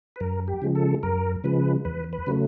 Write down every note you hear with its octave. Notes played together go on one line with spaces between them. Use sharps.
B4
F#2 A#4
G4
C#3 F3 G#3
A4
F#2 A#4
C#3 F3 G#3 B4
E2 B4
B4
C#3 F#3 A3